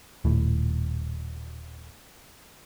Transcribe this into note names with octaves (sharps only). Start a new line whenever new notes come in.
D#1 A2